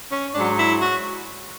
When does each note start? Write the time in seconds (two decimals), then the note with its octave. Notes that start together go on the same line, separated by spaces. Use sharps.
0.12 C#4
0.35 G#2 F#3 D4
0.58 E4
0.81 F#4